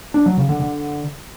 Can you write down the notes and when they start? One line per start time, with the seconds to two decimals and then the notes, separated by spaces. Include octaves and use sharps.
0.14 D4
0.26 F#3
0.37 C#3
0.49 D3
0.60 D3